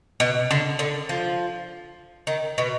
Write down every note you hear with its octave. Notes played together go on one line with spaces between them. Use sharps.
B2
D3
D3
F3
D#3
B2